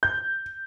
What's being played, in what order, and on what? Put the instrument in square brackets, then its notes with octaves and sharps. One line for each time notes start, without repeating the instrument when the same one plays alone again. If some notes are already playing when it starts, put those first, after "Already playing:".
[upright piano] G6